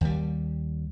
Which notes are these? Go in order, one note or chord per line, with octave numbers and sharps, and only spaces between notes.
D#2 G3